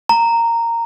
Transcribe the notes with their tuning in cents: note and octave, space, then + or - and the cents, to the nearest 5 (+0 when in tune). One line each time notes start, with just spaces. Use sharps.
A#5 -10